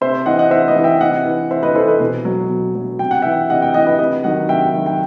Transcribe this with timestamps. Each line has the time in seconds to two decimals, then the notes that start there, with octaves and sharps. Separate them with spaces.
0.01 C3 C5 E5
0.26 E3 D#5 F#5
0.39 D#5 F#5
0.51 C3 C5 E5
0.68 B4 D#5
0.76 E3
0.84 E5 G5
1.00 C3 D#5 F#5
1.26 E3
1.50 C3 C5 E5
1.63 B4 D#5
1.75 E3 A4 C5
1.88 B4 D#5
2.00 B2
2.25 F#3
2.50 B2
2.75 F#3
2.99 C3 G5
3.11 F#5
3.22 E3 E5 G5
3.49 C3 D#5 F#5
3.62 E5 G5
3.74 E3 D#5 F#5
3.87 B4 D#5
3.99 C3 B4 D#5
4.24 D#3 F#3 D#5 F#5
4.49 C3 E5 G5
4.74 D#3 F#3
4.86 G5